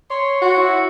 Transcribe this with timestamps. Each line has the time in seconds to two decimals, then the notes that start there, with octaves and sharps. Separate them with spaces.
0.10 C#5 C6
0.41 F#4
0.57 E4